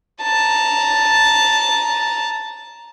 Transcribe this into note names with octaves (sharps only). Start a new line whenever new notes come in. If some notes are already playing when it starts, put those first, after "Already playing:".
A5 A#5